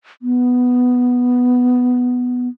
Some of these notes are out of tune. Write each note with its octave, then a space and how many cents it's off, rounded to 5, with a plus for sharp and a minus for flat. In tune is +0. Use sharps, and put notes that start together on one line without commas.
B3 +5